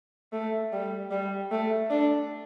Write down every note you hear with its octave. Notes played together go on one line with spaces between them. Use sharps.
A3
G3
G3
A3
D4